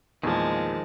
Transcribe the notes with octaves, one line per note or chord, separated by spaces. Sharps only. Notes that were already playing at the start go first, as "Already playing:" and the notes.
E2 A#2 D#3 F3 G#3 A5